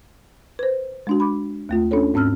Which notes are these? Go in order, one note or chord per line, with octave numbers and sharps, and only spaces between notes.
B4 C5
G#3 D4 F#4
B5 D6
D#2 A3 F4
C#4 D4 A4 C#5
G#2 C4 C#4 E6 F6